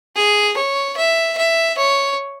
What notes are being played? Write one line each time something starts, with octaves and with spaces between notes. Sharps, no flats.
G#4
C#5
E5
E5
C#5